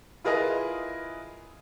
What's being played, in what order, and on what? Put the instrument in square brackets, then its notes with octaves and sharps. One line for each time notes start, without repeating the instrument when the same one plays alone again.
[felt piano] E4 F4 G#4 A#4 B4 D#5